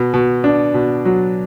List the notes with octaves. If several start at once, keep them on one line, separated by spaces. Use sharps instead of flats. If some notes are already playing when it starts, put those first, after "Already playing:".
Already playing: B2
B2
D4
B2
F#3